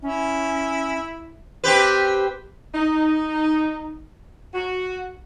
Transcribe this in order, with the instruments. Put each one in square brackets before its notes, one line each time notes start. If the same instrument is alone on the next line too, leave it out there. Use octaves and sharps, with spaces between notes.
[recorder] C#4 [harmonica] E4
[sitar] C4 G4 B4
[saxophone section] D#4
F#4